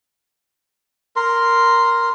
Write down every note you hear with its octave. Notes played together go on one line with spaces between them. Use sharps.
A#4 C6